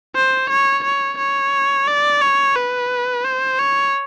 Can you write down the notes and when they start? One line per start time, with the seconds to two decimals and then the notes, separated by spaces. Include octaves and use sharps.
0.15 C5
0.50 C#5
0.84 C#5
1.18 C#5
1.87 D5
2.21 C#5
2.56 B4
3.24 C5
3.59 C#5